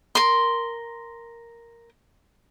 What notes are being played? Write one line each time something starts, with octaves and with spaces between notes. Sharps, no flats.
A#4 C6